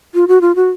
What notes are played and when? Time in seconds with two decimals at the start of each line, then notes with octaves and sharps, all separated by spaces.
0.15 F4
0.28 F#4
0.41 F4
0.56 F#4